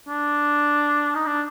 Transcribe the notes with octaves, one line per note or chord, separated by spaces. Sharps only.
D4
D#4
D4